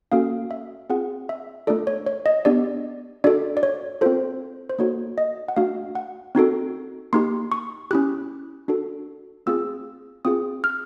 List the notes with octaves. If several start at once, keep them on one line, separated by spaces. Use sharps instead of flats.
A#3 C#4 F#4 A4 F5
E5
C4 F4 G#4 F#5
E5
A3 D4 F4 A4 D5
C#5
C#5
D#5
B3 D4 G4 D5
D4 F#4 A4 D5
D5
C#5
C4 F4 A4 C5
C5
A#3 D#4 F#4 A4 C#5
D#5
F#5
A3 D4 F#4 F5
F#5
C4 D#4 F#4 A4
A#3 D#4 G4 C6
C#6
C#4 E4 G4 F#6
D4 F#4 A4
A3 C4 F4 G#4 E6
C4 F4 G#4 D#6
F6